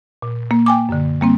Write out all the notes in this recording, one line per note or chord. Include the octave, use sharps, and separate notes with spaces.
A#2
A#3
G5 G#5 D6
F#2 D3
G3 A#3 C4